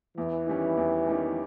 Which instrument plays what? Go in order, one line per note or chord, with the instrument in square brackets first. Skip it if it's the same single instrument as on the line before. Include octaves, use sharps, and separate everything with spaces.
[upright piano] E2 [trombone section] E3
[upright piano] D#3 G3 C#4
E2
D#3 G3 C#4